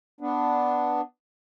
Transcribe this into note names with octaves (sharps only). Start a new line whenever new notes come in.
B3 D4